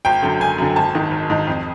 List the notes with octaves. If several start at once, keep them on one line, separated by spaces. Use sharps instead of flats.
G#1 G5
F#2 D3
G#1 G#5
F#2 D3
G#1 A5
G#2 D#3
G#1
G#2 D#3
F2